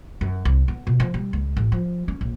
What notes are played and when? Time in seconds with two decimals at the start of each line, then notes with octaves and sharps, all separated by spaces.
0.21 F#2
0.45 C2
0.68 B3
0.87 B2
1.00 F3
1.14 G3
1.33 C#2
1.57 A1
1.72 F3
2.08 C#4
2.21 A#1